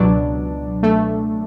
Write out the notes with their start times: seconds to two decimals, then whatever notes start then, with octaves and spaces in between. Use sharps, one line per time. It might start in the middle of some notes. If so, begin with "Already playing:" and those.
Already playing: C#2 B2 F#3 D4
0.83 A3